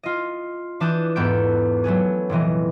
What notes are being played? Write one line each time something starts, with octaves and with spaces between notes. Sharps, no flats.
F4 D#5
E3 D4 A5 D#6 F#6 G6
E2 G#2 B3 A4 G6 D7
F#3 A3 B3 G#4
F1 A#2 E3 D#5